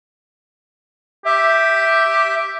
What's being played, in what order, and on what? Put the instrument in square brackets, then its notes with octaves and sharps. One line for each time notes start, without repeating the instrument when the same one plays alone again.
[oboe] G4 [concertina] E5